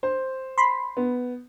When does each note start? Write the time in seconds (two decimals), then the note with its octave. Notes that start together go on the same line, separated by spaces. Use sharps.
0.03 C5
0.58 B5 C6
0.97 B3